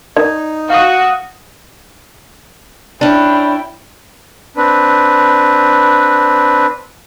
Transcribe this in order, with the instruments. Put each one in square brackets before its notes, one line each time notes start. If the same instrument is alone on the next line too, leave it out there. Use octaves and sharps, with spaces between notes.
[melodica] D#4 [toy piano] D5
[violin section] F#4 [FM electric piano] F5 D#6
[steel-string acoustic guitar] C#4 D4 [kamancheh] E4 G5
[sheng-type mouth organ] C4 D4 B4